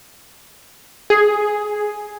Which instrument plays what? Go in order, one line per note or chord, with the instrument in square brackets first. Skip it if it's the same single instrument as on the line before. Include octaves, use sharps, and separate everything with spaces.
[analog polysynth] G#4